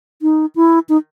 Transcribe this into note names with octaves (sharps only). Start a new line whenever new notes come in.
D#4
E4
D#4